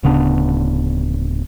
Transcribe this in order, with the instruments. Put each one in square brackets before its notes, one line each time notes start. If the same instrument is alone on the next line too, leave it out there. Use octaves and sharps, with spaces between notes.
[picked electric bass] D1 C#3 B3 D4